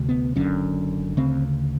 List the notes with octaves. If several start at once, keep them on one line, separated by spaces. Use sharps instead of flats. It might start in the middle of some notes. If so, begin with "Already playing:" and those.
Already playing: D2 C3
B3
F#1 F#2 D3 C#4
D2 C#3 C4